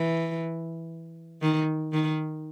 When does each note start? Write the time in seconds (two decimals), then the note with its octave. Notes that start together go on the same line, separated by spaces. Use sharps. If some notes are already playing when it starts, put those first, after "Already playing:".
Already playing: E3
1.42 D#3
1.93 D#3